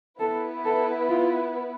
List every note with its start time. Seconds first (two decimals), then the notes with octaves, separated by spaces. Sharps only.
0.20 B3 E4 A4 B4
0.65 A4
1.09 F4